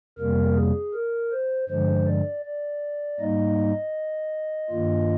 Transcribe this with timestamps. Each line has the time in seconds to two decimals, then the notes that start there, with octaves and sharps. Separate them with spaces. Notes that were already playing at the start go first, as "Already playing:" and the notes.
0.18 F2 C3 G3 A#3 A#4
0.56 G#4
0.94 A#4
1.32 C5
1.69 G2 D3 F3 G#3 C5
2.07 D5
2.45 D5
3.20 G#2 G3 A#3 D#4 D#5
4.70 G2 D#3 A#3 F4